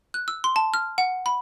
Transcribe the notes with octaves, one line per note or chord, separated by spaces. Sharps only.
F#6
E6
C6
A5
F6
F#5
B5